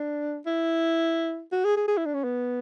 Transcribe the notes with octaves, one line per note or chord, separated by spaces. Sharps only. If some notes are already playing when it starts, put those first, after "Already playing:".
Already playing: D4
E4
F#4
G#4
G#4
G#4
E4
D4
C#4
B3